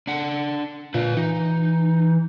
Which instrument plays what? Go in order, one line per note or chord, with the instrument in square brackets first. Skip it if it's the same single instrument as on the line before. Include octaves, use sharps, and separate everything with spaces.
[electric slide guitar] D4 F#5
[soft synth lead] A#2 [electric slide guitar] F4 B4
[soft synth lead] E3 [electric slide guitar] D#4